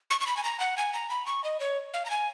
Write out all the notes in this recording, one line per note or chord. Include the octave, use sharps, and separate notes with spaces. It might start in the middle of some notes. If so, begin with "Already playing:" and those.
C#6
C#6
B5
G#5
A#5
F#5
G#5
A#5
B5
C#6
D#5
C#5
F5
A#5
G#5